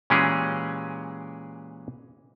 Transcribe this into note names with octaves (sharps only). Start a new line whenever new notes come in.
A#2 E3 G#3 C#4 G4 G#4